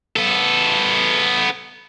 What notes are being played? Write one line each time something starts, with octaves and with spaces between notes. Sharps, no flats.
B3 A4